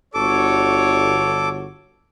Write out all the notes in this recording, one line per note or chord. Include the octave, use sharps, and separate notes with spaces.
G1 F#4 A4 C#5 D6